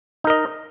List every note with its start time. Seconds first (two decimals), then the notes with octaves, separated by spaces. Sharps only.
0.24 D#4
0.27 A#4
0.30 D#5